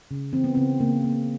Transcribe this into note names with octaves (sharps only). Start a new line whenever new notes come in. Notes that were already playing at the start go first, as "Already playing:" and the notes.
C#3
E3 C4
B3
C#3 C4
C#3 A#3
A#3